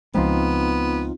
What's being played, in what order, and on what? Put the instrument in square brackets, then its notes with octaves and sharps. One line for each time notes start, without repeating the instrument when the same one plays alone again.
[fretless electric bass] C#2 F3 G#3 [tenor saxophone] B3 [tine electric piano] C4 D#4 F4